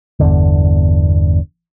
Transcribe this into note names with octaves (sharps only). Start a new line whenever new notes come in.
G1 E2 D3